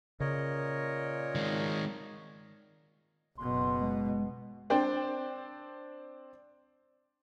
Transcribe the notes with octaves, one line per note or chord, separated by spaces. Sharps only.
A#2 C#3 A#4 C#5 D#5
D#3 G#3
F#1 B2 C6
G#3
C4 D4 C5 G5